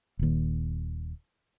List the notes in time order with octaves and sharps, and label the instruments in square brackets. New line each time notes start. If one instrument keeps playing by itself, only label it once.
[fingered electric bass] D#1 D#2